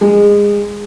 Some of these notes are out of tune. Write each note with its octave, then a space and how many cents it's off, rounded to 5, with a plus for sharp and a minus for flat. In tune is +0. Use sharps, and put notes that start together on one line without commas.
G#3 -20